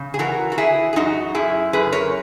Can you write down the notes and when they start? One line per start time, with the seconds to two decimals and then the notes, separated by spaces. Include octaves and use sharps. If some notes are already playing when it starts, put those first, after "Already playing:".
Already playing: C#3
0.14 G#4
0.19 E3 F#4 A#4
0.52 F#4
0.58 E3 E4 G#4
0.93 G#4
0.96 F#2 D#4 F#4
1.35 F#2 E4 G#4
1.73 F#2 G#4 B4
1.93 A#4 C#5